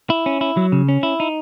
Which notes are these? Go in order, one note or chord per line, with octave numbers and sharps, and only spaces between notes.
E4
C#4
E4
F#3
C#3
C#4
E4
D#4